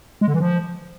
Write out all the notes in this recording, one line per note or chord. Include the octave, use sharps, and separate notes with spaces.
G#3
D3
E3
F3